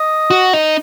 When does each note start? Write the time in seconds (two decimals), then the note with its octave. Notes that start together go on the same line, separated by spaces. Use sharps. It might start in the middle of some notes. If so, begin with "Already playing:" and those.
Already playing: D#5
0.30 F#4
0.53 D#4